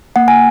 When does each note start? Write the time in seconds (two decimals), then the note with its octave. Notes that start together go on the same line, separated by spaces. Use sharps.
0.16 A#3 F#5
0.28 G#5